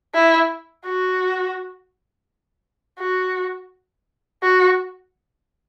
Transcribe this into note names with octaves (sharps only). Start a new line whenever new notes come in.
E4
F#4
F#4
F#4